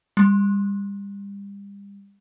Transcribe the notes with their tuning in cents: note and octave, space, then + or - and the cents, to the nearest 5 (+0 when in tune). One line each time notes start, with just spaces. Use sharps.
G3 +35